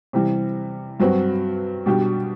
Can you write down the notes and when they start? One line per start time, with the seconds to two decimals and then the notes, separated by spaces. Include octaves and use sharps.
0.13 C3 E3 G3
1.00 G2 F#3 C4 F#4 B4
1.86 B2 G3 D4 G4